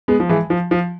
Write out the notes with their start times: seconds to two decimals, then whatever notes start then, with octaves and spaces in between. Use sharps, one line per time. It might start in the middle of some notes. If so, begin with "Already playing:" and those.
0.08 G#3 B3
0.20 F3
0.29 E3 G#3
0.50 F3
0.71 F3